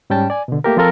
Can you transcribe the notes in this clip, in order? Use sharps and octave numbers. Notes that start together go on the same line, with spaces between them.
G#2 G3 C#4 G5 A5
D5 G#5
B2 D3
A3 A#3 G4 A#4
F3 C4 F4 A4 A#4